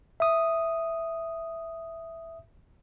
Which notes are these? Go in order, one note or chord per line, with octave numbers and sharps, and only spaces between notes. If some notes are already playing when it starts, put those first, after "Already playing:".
E5 D#6